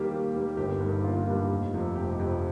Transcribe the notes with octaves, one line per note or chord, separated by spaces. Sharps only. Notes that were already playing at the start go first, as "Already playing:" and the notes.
Already playing: D#2 D#3 G3 A#3 G4
D#2
D#3 G3 A#3
G1 G4
G2 D#3 G3 A#3
G1 F4
G2 D#3 G3 A#3
F1
F2 C3 F3
F1 G4
F2 C3 F3